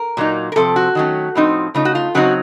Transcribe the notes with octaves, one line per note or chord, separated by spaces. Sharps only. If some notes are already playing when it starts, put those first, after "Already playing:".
Already playing: A#4
A#2 F#3 A#3 D#4
A#4
C3 F3 C4 A4
F#4
D#3 F#3 A3 C#4
A2 F3 C4 D#4
C#3 A3 D#4 F4
F#4
F4
C#3 F#3 C4 D#4 F#4